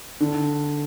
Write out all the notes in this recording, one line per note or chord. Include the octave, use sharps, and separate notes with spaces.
D3